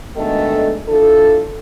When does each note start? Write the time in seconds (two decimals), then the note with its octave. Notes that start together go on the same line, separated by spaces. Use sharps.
0.16 B2 D#3 G#3 A3 D4 A4
0.87 D4 E4 F4 A4